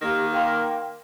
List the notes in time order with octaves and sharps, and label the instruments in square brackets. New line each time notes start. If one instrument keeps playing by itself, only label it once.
[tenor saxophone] D#3 [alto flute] A#3 [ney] G4 [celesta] A#6
[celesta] A#4 F5 C6 [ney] G5